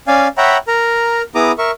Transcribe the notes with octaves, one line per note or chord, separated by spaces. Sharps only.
C#4 D5 F5 G#5
C#5 E5 F#5 G5 A#5 B5
A#4 A#5
B3 E4 G#4 A#5 D6 D#6
A#4 E5 C#6